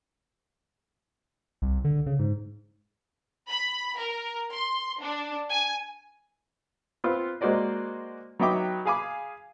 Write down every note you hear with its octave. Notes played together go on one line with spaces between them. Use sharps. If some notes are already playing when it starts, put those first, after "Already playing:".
C2
D3
C#3
G#2
B5
A#4
C6
D4
G#5
B3 C4 F4
G#3 A#3 F#4 C5 D5 D#5
F#3 B3 D#4 E5 G5 D6
G#4 F5 G#5 B5 D6